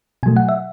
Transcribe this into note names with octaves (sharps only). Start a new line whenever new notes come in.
B2 F#3 A3 G#5
F#5
E5